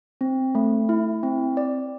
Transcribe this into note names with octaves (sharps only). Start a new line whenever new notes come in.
C4
A3
E4
C4
D5